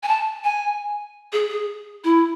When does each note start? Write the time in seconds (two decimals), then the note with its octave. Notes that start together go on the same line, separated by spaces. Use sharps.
0.03 G#5
0.08 A5
0.44 G#5
1.32 G#4
1.50 G#4
2.04 E4